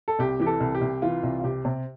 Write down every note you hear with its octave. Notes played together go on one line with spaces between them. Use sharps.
A4
C2 G4
E3 G4
A4
C2
G4
C2
E3 F4
C2
F4
C3 G4
C3